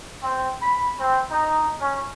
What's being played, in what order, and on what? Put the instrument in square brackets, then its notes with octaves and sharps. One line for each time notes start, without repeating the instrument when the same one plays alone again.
[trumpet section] C4
B5
C4
D#4
C#4